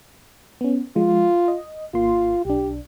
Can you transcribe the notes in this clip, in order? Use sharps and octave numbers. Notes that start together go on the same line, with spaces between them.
B3 C#4
F3 G#3 F4
D#5
G#1 A#3 F4 C6
B1 D4 G4